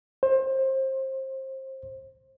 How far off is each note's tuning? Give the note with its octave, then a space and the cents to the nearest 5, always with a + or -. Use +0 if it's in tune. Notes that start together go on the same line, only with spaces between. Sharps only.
C5 +25